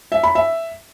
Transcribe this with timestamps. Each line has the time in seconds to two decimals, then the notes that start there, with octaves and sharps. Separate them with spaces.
0.12 E5
0.23 B5
0.35 E5